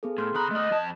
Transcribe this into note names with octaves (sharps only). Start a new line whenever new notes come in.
B3 G#4 A4
A2 C6 F6
C#3 A#5 B5 D#6 F#6
A3 D5 D#5
F2 A5